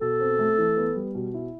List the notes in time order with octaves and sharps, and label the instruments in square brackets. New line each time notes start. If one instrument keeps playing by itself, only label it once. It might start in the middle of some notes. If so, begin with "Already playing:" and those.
[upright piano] B2 [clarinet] A4
[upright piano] C4
A3
E3
B3
G3
B2
E4